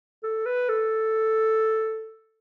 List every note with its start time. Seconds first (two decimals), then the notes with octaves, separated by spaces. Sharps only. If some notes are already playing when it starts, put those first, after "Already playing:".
0.23 A4
0.46 B4
0.69 A4